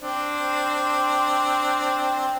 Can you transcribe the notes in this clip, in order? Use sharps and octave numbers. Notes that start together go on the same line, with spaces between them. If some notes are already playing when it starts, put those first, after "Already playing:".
C4 D4